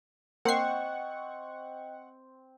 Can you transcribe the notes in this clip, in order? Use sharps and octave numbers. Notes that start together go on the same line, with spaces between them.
A#3 C4 D#5 F#5 G5 C#6 C7